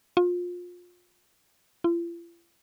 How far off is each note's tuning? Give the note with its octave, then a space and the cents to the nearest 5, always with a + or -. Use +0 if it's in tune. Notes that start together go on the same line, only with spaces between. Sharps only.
F4 +25
F4 -45